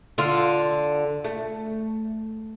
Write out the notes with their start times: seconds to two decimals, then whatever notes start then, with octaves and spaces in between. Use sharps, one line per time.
0.18 D3 F4
1.24 A3